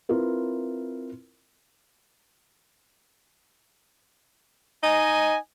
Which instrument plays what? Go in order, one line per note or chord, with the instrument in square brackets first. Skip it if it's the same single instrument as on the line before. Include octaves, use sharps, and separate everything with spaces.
[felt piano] C4 E4 F4 A#4 B4
[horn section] D#4 D#5 G#5